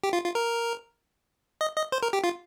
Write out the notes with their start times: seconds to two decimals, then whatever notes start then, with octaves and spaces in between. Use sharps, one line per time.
0.04 G4
0.13 F4
0.24 F4
0.35 A#4
1.61 D#5
1.76 D#5
1.92 C5
2.03 A#4
2.13 G4
2.24 F4